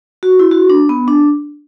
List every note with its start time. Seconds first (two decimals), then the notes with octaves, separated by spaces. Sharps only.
0.23 F#4
0.39 E4
0.51 F#4
0.70 D4
0.89 B3
1.08 D4